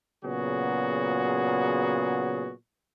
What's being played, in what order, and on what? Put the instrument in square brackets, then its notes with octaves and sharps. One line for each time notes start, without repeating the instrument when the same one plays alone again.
[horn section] A#2 C#3 F#3 B3 F#4 G#4